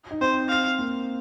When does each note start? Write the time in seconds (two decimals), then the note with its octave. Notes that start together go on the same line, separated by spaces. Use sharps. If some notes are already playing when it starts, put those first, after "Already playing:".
0.11 D#4
0.21 C4 C5
0.50 F5
0.79 A#3